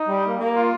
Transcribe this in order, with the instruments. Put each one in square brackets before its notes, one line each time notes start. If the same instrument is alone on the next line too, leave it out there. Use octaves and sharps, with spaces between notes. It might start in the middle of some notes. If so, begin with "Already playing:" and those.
Already playing: [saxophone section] D#4
G3
A#3
A#3
F4